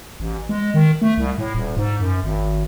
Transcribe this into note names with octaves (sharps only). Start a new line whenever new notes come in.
A1
G#3
D#3
A3
C2
A2
D#1
G#2
F#2
G#1